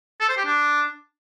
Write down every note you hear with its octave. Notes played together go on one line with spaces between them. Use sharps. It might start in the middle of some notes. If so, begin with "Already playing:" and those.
A4
C5
G4
D4